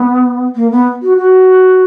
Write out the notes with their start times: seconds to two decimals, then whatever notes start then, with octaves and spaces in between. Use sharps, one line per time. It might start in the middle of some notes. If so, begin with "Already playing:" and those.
Already playing: B3
0.56 A#3
0.71 B3
1.02 F#4
1.17 F#4